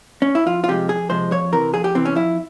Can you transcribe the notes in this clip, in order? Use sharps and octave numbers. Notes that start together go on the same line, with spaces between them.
C#4
E4
F2 F4
F4
C3 F3 G#3 G4
F2 G#4
C3 F3 G#3 C5
F2 C#5
C3 E3 A#4
F2 G#4
G4
C3 E3 C4
C#4
F2 E4